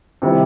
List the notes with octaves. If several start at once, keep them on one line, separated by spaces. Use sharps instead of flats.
C3 D#3 G3 C4 E4